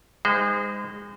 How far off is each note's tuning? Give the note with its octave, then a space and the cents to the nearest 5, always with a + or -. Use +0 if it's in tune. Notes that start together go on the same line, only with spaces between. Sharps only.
G#3 -30 D#4 +0 C5 -30